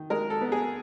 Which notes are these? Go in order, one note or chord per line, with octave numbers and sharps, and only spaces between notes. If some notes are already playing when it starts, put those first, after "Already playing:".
Already playing: D#3
G#3 A#4
A4
B3
G#4